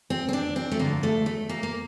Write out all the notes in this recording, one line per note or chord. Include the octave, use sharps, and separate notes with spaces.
C4
C4
D4
C4
A3
G2 D3 F3 A#3
A3
A3
A#3
A#3